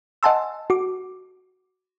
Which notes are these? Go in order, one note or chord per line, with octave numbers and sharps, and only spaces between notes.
D#5 F#5 G#5 A5 C6 E6
F#4 D6